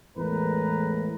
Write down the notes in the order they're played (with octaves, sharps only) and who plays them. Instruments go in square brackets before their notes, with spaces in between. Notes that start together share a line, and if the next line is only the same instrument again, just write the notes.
[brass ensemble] E2 A2 G#3 A#4 B4 A#5